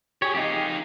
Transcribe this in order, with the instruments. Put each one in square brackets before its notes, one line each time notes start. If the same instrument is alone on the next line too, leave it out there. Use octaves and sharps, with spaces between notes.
[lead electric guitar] G4 G#4 [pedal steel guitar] C#5
[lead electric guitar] F2 D#4 [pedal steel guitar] G4 G#4